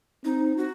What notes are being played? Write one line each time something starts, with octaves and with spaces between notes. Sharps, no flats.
C4 D#4
F#4